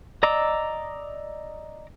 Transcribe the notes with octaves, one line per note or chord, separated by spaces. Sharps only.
D5 D#5 A#5 D6 E6